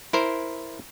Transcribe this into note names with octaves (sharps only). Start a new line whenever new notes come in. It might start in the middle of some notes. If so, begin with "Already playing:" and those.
E4 A#4 C5